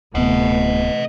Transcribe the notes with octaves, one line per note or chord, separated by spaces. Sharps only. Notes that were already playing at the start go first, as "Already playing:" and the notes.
D1 C3 E3 A3 B3 D#5 F#5